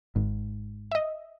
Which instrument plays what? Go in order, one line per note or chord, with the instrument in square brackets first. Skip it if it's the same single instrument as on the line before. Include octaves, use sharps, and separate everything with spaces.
[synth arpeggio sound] G#1 [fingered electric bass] G#2
[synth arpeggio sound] D#5 E5